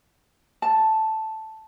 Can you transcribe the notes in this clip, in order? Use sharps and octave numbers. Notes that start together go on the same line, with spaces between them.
A5